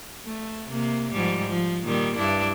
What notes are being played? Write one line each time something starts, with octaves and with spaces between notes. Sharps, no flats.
A3
C3 A#3
G#2 F3 G3
F3
A#2 D#3 G3
G2 D4 E4